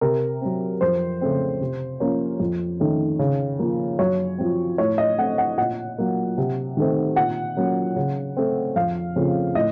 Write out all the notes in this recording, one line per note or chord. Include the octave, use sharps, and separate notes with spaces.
C3 A#4
F#3 C4
F2 C5
C#3 A3 C4
C3
F3 A#3 C#4
F2
D#3 A3 C#4
C#3
F3 A#3
F#2 C#5
F3 C4
A2 C#5
D#5
A3 C4 F#5
F#5
A#2 F#5
F#3 A#3
C3
D#3 A3 C4
A#2 F#5
F#3 A#3 C#4
C#3
A3 C4
F2 F5
C#3 F3 A3 C4
A2 D#5